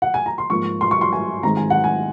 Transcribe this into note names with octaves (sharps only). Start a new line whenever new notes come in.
F#5
G#5
A#5
C6
G#2 F3 A#3 C#6
C6
C#6
C6
G#5
G#2 D#3 G#3 C4 A#5
G#5
F#5
G#5